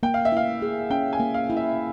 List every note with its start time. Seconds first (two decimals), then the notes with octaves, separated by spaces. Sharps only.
0.03 A#3 G5
0.14 F5
0.25 E5
0.32 E4 F5
0.62 G#4
0.90 C#4 G5
1.13 G#5
1.20 A#3
1.34 F5
1.50 E4
1.57 E5